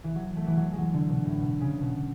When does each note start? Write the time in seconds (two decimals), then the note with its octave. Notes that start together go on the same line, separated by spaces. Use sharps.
0.04 E3
0.15 F#3
0.36 A3
0.47 E3
0.57 F#3
0.72 G#3
0.78 F#3
0.93 D3
1.09 B2
1.25 A2
1.40 B2
1.60 C#3
1.81 B2